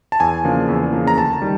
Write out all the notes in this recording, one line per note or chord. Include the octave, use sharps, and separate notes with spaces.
A5
E2 G#5
C#3 F3 A#3 D4
E2
C#3 F3 A#3 D4
A#5
D2 A5
D#3 G3